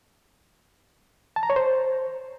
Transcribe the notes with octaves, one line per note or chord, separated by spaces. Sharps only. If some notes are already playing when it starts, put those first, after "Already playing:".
A5
A#5
C#5
C5